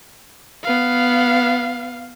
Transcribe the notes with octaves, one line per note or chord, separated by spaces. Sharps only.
B3 F5